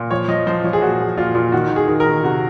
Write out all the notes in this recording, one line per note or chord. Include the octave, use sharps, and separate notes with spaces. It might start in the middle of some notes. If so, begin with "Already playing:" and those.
Already playing: A#2
F3 C#5
F3 D#5
F3 C5
F3 C#5
G#4
A#2 F#4
F3
A#2 F4
A#2
D#3 F#4
D#3
G#4
D#3
A#4
D#3
C3 F#4